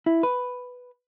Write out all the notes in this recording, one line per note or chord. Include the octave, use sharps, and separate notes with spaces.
E4
B4